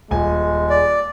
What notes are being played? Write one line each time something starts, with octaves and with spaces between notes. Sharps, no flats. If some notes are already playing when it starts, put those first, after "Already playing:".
D#1 G#3 G#5
D5